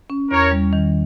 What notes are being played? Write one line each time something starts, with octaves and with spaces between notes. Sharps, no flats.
C#4
E2 A#4 C#5
G3
D#3